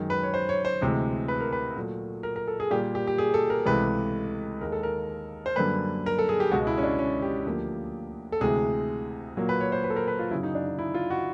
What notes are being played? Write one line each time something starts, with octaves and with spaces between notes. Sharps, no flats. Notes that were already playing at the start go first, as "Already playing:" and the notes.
Already playing: F#2 D#3 G#3
B4
C#5
C5
C#5
C5
D2 C3 E3 G#3
B4
A#4
B4
A#2 F#3 A3
A#4
A#4
A4
G#4
A#2 G3 A#3 G4
G4
G4
G#4
A4
A#4
C#2 C3 E3 A3 B4
D#2 D#3 G#3 A#4
A4
A#4
C5
F#2 D3 G3 A#3 B4
A#4
A4
G#4
G4
C#2 B2 G#3 F#4
E4
C#4
D4
C#4
G4
D2 D3 F3 A#3
A4
D2 C3 E3 G#3 G#4
A#2 F#3 A#3
B4
C#5
C5
B4
A4
A#4
B4
F4
F#2 C#3 F#3 E4
D#4
D4
D#4
E4
F4
F#4